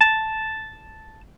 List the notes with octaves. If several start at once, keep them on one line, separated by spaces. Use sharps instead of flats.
A5